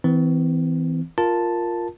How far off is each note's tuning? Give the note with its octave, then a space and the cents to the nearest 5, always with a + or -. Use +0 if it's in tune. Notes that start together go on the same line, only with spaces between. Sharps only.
E3 -20 C4 -40
F4 +0 A#4 +0 A5 +0